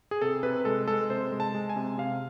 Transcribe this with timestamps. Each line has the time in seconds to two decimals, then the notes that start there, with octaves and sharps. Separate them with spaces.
0.11 G#4
0.21 C3 A4
0.43 C3 B4
0.65 G#3 A4
0.88 G#3 A4
1.10 C3 C5
1.32 G#3
1.40 A5
1.55 G#3
1.69 G#5
1.76 C3
1.98 C3 F5